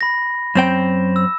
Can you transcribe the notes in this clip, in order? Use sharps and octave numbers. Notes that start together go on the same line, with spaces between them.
B5 A#6
F#2 C4 G5 E7
E6